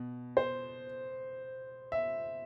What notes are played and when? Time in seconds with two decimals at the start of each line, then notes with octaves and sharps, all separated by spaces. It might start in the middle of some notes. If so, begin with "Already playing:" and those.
Already playing: B2
0.37 C5
1.92 E5